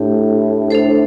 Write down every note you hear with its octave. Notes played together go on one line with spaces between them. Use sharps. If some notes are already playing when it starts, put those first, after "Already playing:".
Already playing: A2 A3 D4 G4
D4 A4 C5